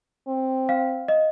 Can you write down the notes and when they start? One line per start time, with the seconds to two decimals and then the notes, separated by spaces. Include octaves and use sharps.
0.28 C4
0.69 F5
1.08 D#5